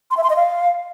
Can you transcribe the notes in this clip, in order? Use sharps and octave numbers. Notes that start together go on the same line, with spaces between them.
C6
E5
C6
D#5
F5